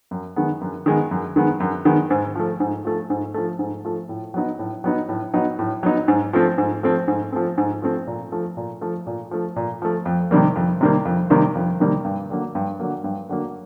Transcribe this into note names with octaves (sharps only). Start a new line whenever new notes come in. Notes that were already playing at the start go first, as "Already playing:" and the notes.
F#2
D#3 G#3 B3
F#2
D#3 G#3 B3
F#2
D#3 G#3 B3
F#2
D#3 G#3 B3
G#2
F3 A3
G#2
F3 A3
G#2
F3 A3
G#2
F3 A3
A2
F#3 B3 D#4
A2
F#3 B3 D#4
A2
F#3 B3 D#4
A2
F#3 B3 D#4
G#2
F3 A3 C4
G#2
F3 A3 C4
G#2
F3 A3 C4
G#2
F3 A3 C4
A#2
F3 A3
A#2
F3 A3
A#2
F3 A3
A#2
F3 A3
F2
C3 D#3 G3 A#3
F2
C3 D#3 G3 A#3
F2
C3 D#3 G3 A#3
F2
C3 D#3 G3 A#3
G2
D3 F#3 A#3
G2
D3 F#3 A#3
G2
D3 F#3 A#3